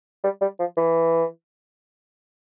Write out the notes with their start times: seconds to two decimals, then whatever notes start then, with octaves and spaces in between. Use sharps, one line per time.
0.24 G3
0.41 G3
0.59 F3
0.77 E3